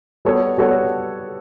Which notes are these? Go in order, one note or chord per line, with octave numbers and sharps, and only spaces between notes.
G3 B3 F#4 A4 C#5
G3 B3 F#4 A4 C#5